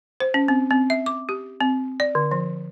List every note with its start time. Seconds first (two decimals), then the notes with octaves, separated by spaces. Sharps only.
0.20 C5
0.34 C#4
0.48 C4
0.71 C4
0.90 E5
1.06 D6
1.29 G4
1.61 C4
2.00 D5
2.15 D3
2.31 F3